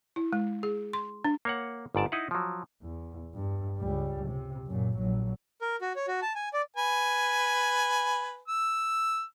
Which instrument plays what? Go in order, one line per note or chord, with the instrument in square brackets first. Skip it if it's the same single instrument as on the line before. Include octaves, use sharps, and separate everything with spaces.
[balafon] E4
G#3
G#4
C6
D4
[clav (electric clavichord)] A#3 C#5 F#5
G1 G#2 D5 A5
D#4 E4 D#5 F#5
F3 F#3
[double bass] E2
G2
C#2 G3
C3
F#2 A#2
A#1 F#3
[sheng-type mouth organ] A#4
F#4
C#5
F#4
A5
G#5
D5
[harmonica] B4 G#5
E6